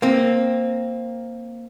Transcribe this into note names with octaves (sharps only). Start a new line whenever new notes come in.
A#3 C4